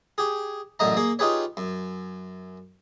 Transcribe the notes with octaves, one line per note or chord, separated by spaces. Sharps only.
G4 G#4
A1 F#2 D3 D#5 A#5
A#3 G#4
D#4 F4 G4 G#4 B4 C#5
F#2